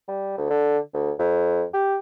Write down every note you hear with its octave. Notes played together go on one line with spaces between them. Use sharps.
G3
D2
D3
D2
F2
G4